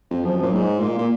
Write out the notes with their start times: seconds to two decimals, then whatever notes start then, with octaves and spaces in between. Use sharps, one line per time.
0.11 F2
0.24 F#2 F3
0.37 F3
0.42 A#2 F#3
0.53 G#2
0.67 G#3
0.80 A#2
0.87 A#3
0.98 A#2